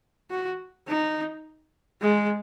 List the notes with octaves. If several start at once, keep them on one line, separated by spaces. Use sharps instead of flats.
F#4
D#4
G#3